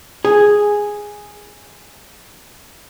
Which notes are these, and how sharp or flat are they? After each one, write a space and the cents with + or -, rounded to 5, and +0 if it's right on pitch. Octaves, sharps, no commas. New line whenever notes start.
G#4 -5